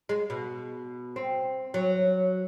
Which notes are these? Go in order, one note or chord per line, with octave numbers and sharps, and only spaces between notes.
G#3
B2
C4
F#3